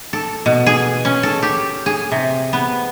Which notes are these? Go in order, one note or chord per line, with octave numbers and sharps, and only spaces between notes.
A4
B2
G#4
C#4
A4
G4
G#4
C3
B3